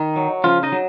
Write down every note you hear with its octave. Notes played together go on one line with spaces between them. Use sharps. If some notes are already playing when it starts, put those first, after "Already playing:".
Already playing: D#3 D#4
F#3
C#3 F3 F4
D#4 D#5
F#3